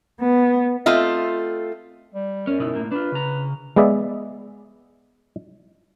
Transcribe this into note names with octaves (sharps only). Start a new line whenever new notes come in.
B3
A3 C4 F4 D#5
G3
F#2 C#4
B2 D#4 E4
A2 A#3
D4 F4 B4
C#3 A#5
G#3 B3 G#4 D5 E5